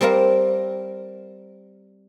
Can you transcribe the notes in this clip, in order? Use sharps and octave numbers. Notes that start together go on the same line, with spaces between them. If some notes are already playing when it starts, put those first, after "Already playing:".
G3 C4 A#4 F5